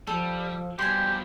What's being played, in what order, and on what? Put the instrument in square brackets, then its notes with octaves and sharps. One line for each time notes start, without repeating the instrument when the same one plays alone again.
[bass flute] F3 [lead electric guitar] G3 [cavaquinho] A4
[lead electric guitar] B2 F3 [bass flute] G3 [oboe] G4 [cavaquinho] G#5 C6